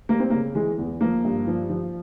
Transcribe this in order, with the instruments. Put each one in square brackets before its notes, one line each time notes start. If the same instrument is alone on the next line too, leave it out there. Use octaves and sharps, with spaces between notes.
[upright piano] G3 A#3
C4
C#3 A#3
E3 G#3
E2
F3 A#3
G2
F3
F3